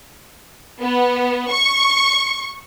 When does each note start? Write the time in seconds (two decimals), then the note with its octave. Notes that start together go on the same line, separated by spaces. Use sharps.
0.81 B3
1.51 C#6